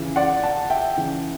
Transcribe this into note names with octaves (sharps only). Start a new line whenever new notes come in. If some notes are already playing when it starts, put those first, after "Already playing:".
Already playing: C#3 E3
D5 F#5
F#5 A5
E5 G5
C#3 E3